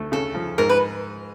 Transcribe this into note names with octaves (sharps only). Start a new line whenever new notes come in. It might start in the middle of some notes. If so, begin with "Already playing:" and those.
Already playing: D2 A3
C#3 A4
F3
G#2 A#4
B4